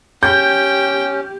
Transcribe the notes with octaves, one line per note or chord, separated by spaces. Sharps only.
C#4 G4 G5 G6